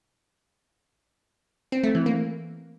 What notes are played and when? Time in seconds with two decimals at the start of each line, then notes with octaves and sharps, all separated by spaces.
1.72 C4
1.84 A3
1.95 E3
2.06 A#3